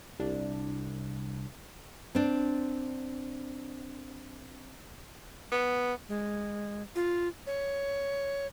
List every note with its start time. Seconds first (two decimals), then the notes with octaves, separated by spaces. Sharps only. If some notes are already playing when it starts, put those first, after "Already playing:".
0.20 C2 D4
2.15 C4 D4
5.52 B3
6.09 G#3
6.95 F4
7.47 C#5